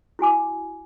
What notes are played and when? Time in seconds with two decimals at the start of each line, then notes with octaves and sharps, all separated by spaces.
0.19 E4 F#4 G#5 D6